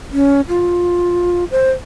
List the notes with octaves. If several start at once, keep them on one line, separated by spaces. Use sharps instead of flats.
C#4
F4
C5